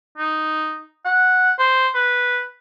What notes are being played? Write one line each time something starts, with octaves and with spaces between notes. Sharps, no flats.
D#4
F#5
C5
B4